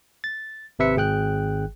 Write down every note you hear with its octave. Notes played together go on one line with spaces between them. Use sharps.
A6
G#1 C3 B4 E5 C#7
G#1 G#4 G5 F#6